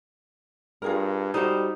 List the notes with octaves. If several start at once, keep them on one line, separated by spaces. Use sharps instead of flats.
G2 F4 G#4 A#4
G3 D#4 F#4 A4 C5